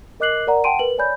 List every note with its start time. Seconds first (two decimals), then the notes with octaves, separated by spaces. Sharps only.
0.20 A#4 D#5 D6 F#6 C7 F#7
0.47 A#4 D5 F#5 A#5
0.64 F#5 G5 A5 C6 D7 D#7
0.79 A#4 B4 F#7
0.98 C#5 D5 G#5 B5 G6